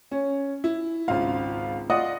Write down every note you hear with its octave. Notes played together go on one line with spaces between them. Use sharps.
C#4
E4
G#1 C#2 F4 F5
F4 D5 D#5 F#5 D#6